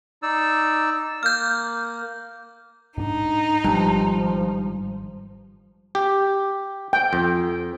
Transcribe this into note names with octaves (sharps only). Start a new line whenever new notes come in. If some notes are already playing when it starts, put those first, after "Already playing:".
D#4 D5 E6
A#3 F6 G6
G#2 D4 D#4
G#1 G2 F3
G4
G5
F2